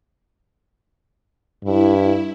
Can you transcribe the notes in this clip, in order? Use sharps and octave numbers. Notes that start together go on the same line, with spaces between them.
G2 E4